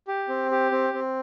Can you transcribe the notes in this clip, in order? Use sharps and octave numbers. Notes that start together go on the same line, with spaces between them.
G4
C4
G4
C4
C4